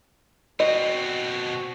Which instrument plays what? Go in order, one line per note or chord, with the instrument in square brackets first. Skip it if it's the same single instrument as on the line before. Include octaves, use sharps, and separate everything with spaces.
[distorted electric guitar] B2 C4 [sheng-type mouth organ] F#4 [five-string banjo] D#5